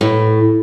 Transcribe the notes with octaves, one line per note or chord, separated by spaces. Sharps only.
A2